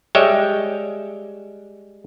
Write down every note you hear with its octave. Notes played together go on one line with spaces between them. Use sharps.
G3 G#3 C#5 E5 G5